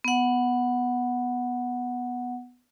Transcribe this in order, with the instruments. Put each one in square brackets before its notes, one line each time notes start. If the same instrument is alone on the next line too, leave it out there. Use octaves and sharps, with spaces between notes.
[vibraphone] B3 F#5